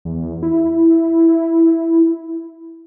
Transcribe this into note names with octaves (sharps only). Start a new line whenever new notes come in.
E2
E4